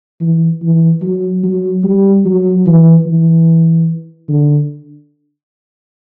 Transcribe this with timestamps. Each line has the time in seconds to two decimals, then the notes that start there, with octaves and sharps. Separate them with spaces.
0.21 E3
0.62 E3
1.02 F#3
1.44 F#3
1.84 G3
2.26 F#3
2.66 E3
3.06 E3
4.29 D3